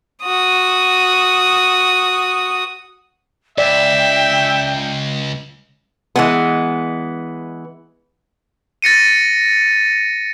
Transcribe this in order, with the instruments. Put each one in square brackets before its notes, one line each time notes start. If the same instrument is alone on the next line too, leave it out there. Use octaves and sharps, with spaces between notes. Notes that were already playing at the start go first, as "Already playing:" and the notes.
[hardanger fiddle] F#4 D#6
[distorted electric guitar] C#2 [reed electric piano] D5 [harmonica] E5 [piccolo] G5
[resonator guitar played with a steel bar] E3 G#3 B3
[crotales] A6 A#6 C#7 D#7